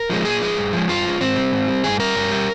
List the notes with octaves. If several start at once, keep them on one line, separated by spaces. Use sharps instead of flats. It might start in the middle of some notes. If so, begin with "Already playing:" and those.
Already playing: A#4
F3 G#3
A#2 G#4
F3 G#3
G2
F3 G#3
G2 F4
F3 G#3
G#2 C4
G3
G#2
G3
G2 G#4
G3 A#4
G2
G3